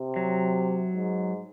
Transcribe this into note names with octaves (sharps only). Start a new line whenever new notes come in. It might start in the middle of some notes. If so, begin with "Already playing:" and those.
Already playing: C3
F#3
G#2